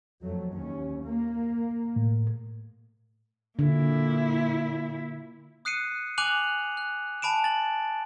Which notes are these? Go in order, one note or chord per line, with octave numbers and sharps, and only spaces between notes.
F2 F#3 A3
D#2 C#4
A#3
A2
A#2 D3 E4
D#6 F#6 C7 C#7 D#7
G#5 D6 F#6 D#7 F7 F#7
F#6
G#5 A5 B5 D7 E7
A6 F#7